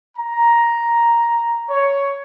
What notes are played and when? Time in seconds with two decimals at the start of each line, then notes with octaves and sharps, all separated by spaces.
0.18 A#5
1.70 C#5